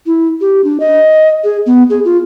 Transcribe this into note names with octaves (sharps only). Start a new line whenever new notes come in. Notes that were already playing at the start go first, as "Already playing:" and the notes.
E4
G4
D4
D#5
G#4
B3
G#4
F4